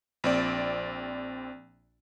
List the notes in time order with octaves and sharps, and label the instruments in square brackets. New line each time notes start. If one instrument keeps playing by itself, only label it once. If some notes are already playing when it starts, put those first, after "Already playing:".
[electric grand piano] A#1 C4 D5